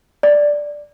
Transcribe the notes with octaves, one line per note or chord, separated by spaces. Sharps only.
D5